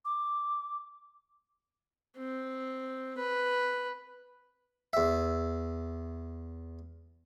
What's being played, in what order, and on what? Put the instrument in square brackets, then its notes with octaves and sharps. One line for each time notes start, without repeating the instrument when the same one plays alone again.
[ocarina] D6
[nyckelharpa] C4
B4
[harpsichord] E2 E5